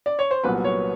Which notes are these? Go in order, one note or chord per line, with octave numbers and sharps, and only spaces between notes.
D5
C#5
C5
C2 A#2 F#3 B3 B4
C#5